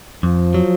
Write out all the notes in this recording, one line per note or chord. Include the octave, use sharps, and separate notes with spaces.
F2 F3
F#3